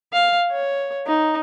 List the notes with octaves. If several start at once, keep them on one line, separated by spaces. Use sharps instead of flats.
F5
C#5
D#4